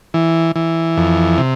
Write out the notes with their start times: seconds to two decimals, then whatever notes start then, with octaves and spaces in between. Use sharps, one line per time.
0.14 E3
0.56 E3
0.97 F2
1.38 C3